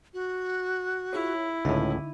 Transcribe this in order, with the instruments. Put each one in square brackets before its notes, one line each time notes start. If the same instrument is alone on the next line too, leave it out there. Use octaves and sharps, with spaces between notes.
[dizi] F#4
[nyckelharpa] E4 [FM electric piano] F4 G#4 C#5
[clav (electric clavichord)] C#2 A2 [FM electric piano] D3 D#4